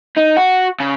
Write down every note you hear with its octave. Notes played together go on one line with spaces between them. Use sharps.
D#4
F#4
C#3